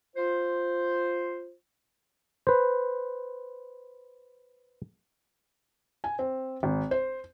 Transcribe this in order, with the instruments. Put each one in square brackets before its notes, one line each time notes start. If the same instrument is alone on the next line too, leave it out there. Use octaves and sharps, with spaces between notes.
[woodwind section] F4 C5
[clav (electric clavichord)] B4 C5
[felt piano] G#5
C4
G#1
C5